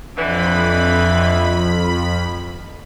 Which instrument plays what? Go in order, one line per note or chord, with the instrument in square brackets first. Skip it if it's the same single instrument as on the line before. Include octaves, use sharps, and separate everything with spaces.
[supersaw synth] F2 B5 [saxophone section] D3 E3